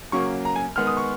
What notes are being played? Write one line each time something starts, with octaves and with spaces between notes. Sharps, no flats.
C#3 F#3 A#3 C#6
A#5
G#5
D#3 G#3 B3 F6
D#6
C#6